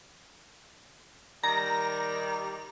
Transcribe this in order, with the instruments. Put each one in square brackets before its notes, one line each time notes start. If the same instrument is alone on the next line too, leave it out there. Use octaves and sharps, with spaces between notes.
[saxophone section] D#3 G3 [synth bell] A#5